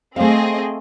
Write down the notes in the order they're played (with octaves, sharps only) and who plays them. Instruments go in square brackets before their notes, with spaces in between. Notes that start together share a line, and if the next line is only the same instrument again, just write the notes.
[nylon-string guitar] A3 F5 [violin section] C4 G#4 D#5